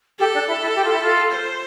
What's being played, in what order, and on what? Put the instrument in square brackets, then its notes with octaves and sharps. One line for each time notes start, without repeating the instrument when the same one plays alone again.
[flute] G4 [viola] A4
[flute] D4
E4
E4
G4
F4
E4
F4
[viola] C5